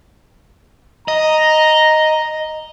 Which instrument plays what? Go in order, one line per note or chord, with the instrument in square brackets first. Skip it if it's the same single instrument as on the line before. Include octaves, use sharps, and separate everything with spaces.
[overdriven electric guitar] D#5 [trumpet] A#5